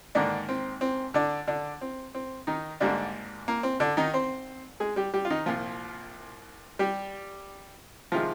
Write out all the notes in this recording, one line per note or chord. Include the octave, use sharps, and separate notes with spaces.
G#2 D3 D#3 A#3 D4
C4
C4
D3 D4
D3 D4
C4
C4
D#3 D#4
G#1 G#2 D3 G3 A#3 D4
A#3
C4
D3 D4
D#3 D#4
C4 C5
G#3 G#4
G3 G4
G3 G4
F4
D#3 D#4
C2 A#2 F3 F4
G3 G4
C3 D#3 F3 G#3 F4